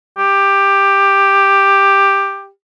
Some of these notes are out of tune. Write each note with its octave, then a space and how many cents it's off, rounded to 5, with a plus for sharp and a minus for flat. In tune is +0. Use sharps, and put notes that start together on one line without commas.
G4 +10